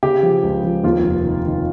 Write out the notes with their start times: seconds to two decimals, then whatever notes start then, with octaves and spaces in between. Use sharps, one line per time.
0.03 C#3 G4
0.23 F3
0.43 C#2
0.64 F3
0.83 D#2 F4
1.04 F1
1.25 D#3
1.45 D#3